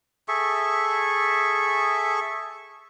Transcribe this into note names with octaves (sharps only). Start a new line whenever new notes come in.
G#4 A4 E5 C#6